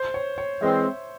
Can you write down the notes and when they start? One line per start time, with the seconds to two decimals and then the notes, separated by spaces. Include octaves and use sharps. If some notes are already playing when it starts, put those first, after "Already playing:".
Already playing: C5
0.14 C#5
0.38 C#5
0.61 E3 G#3 C4 E5